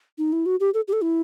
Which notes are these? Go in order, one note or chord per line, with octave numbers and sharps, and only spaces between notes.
D#4
E4
F#4
G4
A4
G4
A4
E4